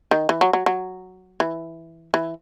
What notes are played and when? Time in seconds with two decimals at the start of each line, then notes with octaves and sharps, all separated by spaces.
0.11 D#3
0.29 E3
0.41 F#3
0.53 F#3
0.66 F#3
1.40 E3
2.14 E3